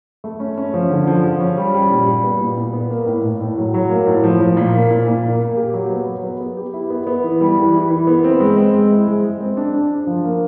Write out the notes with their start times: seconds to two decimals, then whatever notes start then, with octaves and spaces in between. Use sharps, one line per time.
0.24 A3
0.40 C#4
0.58 C#4
0.74 F3
0.90 D3
1.07 F3
1.24 F3
1.40 C#4
1.57 G3
1.74 G3
1.90 A#2
2.07 G3
2.24 B3
2.40 A#2
2.57 A#2
2.73 B3
2.90 A#3
3.06 A2
3.24 A2
3.40 A2
3.58 F#3
3.74 F#3
3.90 A#3
4.07 A2
4.24 F3
4.41 F3
4.57 A#2
4.74 A#3
4.91 A#2
5.07 A#2
5.24 A#3
5.41 A#3
5.57 G4
5.74 F#3
5.90 B3
6.07 F#3
6.24 B3
6.41 B3
6.57 G4
6.74 E4
6.90 B3
7.07 B3
7.24 E3
7.40 G3
7.57 E3
7.74 E3
7.91 E3
8.07 B3
8.24 C4
8.40 G#3
8.57 C4
8.74 G#3
8.91 E4
9.07 G#3
9.24 G#3
9.40 C4
9.57 D4
9.74 D4
9.90 D4
10.07 F3
10.24 A#3